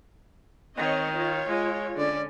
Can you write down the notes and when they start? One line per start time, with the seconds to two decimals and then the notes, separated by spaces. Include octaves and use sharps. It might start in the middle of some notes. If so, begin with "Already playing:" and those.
0.77 D#3 C4 C#5 D#5
1.14 F4 C#5
1.49 G#3
1.97 D3 C#4 D5